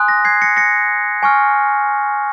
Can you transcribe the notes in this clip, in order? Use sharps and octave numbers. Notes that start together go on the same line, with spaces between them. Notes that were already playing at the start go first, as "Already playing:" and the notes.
Already playing: G#5 C6 D#6 F#6
A#6
G#6 C7
A#6 C#7
A#6 C#7
G#5 C#6 F6